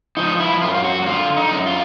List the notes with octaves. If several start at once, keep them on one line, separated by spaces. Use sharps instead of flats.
F3 D#4
E4
F#2 F4
F4
F#4
F#4
D3 F4
D#4
F#2
F4